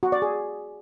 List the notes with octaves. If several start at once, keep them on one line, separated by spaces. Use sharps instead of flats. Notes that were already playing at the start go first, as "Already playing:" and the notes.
F#4
D5
G#4